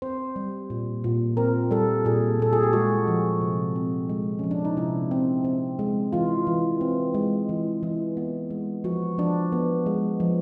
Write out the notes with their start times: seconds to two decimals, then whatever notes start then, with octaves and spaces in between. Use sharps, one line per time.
0.02 C4 C5
0.36 G3
0.70 A#2
1.04 A#2
1.37 C4 A#4
1.71 G3 A4
2.05 A#2 G#4
2.40 A#2 A4
2.53 G#4
2.63 G4
2.73 G#3 F#4
3.08 F3
3.41 C3
3.76 C4
4.09 G#3
4.39 F3 C#4
4.51 D4
4.65 D#4
4.77 C3 E4
5.11 C4
5.44 C4
5.79 G#3
6.13 E3 F4
6.47 E3
6.81 C4
7.14 G#3
7.49 E3
7.83 E3
8.17 B3
8.50 G#3
8.84 F3 F#4
9.18 F3 D4
9.52 B3
9.86 G#3
10.20 F3